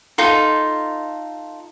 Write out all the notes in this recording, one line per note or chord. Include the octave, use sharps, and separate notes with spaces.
D#4 F4 A4